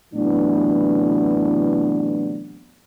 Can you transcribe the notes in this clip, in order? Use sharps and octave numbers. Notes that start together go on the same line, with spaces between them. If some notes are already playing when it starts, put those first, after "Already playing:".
A2 C3 E3 F#3 B3 D4